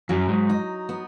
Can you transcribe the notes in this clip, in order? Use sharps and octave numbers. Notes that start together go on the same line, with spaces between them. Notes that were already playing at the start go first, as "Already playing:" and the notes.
F#2 F#3
G#2
D#4
B3